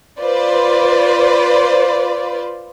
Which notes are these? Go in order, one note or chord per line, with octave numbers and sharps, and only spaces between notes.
F4 B4 C5 D5